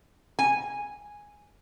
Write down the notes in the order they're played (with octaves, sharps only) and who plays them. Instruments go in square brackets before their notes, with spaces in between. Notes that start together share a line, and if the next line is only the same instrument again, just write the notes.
[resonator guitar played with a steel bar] G#5